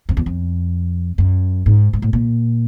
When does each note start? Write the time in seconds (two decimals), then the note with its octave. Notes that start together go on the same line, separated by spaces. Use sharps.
0.09 F2
0.17 E2
0.26 F2
1.18 F#2
1.66 G#2
1.93 G#2
2.02 A2
2.13 A#2